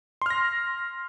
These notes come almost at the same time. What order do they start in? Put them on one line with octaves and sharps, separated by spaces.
C6 F6 A#6